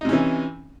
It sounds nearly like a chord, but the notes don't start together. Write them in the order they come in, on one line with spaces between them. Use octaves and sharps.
D#4 C3 C#4 E3